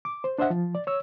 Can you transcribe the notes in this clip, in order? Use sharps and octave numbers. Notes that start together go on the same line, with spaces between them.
D6
C5
D4 C5 D#5 E5 F#5
F3
D5
C#5 E6